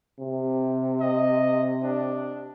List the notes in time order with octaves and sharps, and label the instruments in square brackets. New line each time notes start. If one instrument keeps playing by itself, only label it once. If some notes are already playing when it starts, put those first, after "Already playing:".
[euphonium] C3
[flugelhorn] D#5
D4